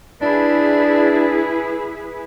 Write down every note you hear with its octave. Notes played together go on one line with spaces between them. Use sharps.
D4 E4 G#4 B4